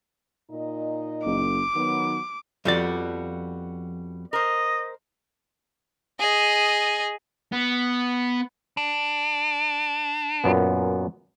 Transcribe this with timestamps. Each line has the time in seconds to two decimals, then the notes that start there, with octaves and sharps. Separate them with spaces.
0.51 A#2 D#4 D#5
1.25 F#1 D6
1.75 D#3 F#3 B3
2.65 F2 F3 G3 B3 F#4 D5
4.33 A#4 C5 D#5
6.20 G#4 D#5
7.52 B3
8.77 D4
10.44 F#2 A#2 B3